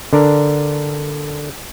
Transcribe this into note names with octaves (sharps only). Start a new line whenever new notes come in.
D3 D4 A#4